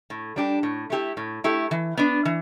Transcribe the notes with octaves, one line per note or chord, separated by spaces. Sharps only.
A2
G3 D4 G4
A2
A3 E4 G4
A2
A3 E4 G4
E3
B3 D4
E3